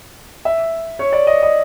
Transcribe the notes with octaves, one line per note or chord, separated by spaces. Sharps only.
E5
C#5
D5
D#5
D#5